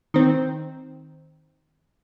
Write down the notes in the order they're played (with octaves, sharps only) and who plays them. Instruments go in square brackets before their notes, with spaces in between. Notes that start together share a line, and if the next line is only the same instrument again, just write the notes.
[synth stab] D#3 C4